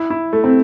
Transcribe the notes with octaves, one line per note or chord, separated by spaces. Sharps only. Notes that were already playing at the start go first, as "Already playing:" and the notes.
Already playing: E4
E4
A3
C4